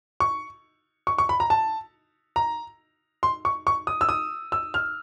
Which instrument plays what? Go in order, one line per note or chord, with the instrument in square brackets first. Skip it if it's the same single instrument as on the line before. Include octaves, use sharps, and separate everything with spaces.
[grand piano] C#6
C#6
C#6
B5
A#5
A5
A#5
C6
C#6
C#6
D#6
E6
D#6
E6
F6